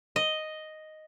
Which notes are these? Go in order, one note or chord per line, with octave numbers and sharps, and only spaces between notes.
D#5